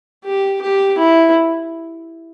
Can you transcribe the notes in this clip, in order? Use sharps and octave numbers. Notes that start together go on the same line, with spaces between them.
G4
G4
E4